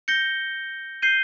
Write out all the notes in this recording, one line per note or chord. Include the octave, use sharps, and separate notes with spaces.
G6 A#6 C#7 G7
G6 C7 D#7 G7